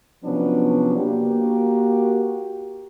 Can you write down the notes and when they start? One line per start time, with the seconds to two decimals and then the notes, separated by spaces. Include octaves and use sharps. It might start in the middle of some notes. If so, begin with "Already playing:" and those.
0.24 C3 F3 F#3 B3 C#4 D4
0.97 A#3 F#4 G4